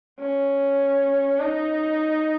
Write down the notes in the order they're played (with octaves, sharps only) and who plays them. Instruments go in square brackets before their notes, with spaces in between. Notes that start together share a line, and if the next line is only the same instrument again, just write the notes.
[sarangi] C#4
D#4